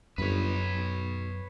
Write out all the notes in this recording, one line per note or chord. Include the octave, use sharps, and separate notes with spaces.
G1 F#2 B4 C#5
B1